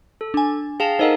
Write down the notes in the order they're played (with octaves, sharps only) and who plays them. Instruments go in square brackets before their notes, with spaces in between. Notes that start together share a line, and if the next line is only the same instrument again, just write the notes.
[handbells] A4
[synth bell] D4 G#5
[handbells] G#4 F5 A5 [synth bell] G5 E7 F7
[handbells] D#4 A4 A#4 [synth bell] C5 D#5 F#5